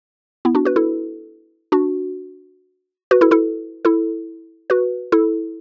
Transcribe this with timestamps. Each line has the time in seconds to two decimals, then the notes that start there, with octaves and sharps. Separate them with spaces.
0.45 B3 E4
0.55 D4 F#4
0.65 F#4 B4
0.76 E4 A4
1.72 D4 F#4
3.11 F#4 B4
3.21 E4 A4
3.31 E4 A4
3.85 E4 A4
4.70 F#4 B4
5.12 E4 A4